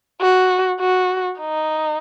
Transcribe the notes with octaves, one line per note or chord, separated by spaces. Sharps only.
F#4
F#4
D#4